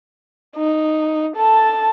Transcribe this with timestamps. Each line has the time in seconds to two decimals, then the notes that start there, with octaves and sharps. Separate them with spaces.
0.56 D#4
1.37 A4 A5